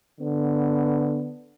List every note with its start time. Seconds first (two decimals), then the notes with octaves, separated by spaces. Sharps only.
0.20 D3 B3